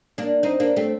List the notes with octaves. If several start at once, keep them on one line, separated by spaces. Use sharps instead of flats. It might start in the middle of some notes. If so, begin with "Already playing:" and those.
A#3 D4
C4 D#4
A#3 D4
A3 C4